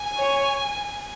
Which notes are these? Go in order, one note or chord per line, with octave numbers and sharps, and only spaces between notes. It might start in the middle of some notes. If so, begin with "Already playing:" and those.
Already playing: G#5
C#5